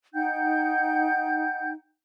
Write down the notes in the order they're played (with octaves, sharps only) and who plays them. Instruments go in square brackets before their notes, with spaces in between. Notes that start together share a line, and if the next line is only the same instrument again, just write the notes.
[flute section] D#4 F#5 G5 G6